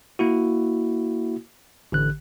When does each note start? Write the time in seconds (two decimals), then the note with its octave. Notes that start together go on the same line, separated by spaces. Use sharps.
0.19 A#3 E4 F#4
1.92 A1 D3 F#6